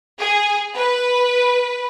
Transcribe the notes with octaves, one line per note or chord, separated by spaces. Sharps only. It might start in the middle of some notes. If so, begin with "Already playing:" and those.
G#4
B4